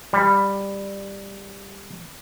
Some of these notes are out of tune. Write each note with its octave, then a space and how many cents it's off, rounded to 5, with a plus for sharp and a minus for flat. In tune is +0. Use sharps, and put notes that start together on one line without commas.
G3 +10